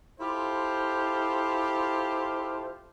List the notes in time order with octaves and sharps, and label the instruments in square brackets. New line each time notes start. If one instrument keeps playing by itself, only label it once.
[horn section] E4 F4 G4 A4 C5